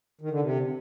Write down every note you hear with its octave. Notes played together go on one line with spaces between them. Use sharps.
D#3
D3
C3